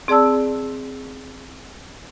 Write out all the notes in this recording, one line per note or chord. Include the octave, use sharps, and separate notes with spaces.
C4 G#4 D5 A5 E6